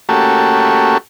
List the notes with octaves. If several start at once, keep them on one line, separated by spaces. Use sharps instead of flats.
A3 A#3 C#4 F#4 G4 A4